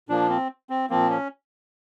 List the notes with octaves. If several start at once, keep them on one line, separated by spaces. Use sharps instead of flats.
A#2 F3 A#3 D4
C4
C4
A#2 F3 A#3 C4
C#4